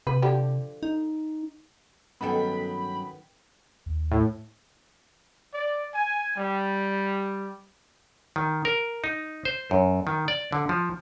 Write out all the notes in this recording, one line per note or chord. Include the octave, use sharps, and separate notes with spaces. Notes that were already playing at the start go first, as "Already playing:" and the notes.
C3 B4
D3 F3 G4
D#4
G2 D#3 F#3 B3 C#4 A4 G5 B5
D#2
A2
D5
G#5
G3
D#3
A#4
D#4
C5
F#2
D#3
D5
D3
F3